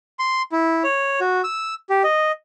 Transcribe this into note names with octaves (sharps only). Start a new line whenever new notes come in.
C6
E4
C#5
F#4
E6
G4
D#5